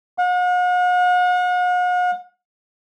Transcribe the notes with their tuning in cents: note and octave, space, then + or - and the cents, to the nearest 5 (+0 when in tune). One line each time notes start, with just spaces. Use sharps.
F#5 -45